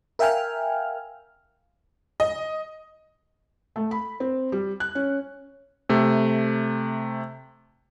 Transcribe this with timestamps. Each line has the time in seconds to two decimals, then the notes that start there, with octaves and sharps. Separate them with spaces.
0.19 A#4 E5 F5 G5 G#5 F6
2.20 D#5
3.76 A3
3.91 B5
4.20 C4
4.52 G3
4.80 F#6
4.95 C#4
5.89 C3 A3